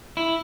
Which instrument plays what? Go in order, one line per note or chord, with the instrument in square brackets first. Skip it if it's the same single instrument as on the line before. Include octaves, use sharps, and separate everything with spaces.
[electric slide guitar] E4